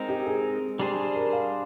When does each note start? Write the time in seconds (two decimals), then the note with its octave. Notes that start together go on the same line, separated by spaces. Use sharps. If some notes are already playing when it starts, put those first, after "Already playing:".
Already playing: G#3 C4 D#4 A#4
0.09 G4
0.26 G#4
0.79 G3 D4 G4 G#4 C5
1.15 A#4
1.33 F5